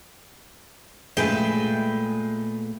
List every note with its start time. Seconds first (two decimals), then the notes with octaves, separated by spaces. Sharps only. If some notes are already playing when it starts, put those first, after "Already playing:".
1.17 A#2 G#3 A3 G#4 B4 G5